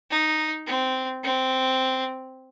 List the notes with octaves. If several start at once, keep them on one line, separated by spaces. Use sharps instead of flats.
D#4
C4
C4